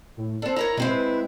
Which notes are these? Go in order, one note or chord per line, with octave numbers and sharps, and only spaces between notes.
A2
C4 D4 A4
E4 A#4 C#5 A#5
B2 G#3 C4 E4
B4